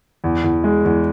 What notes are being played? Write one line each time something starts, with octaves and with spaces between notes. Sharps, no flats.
E2
E2
G#3
E2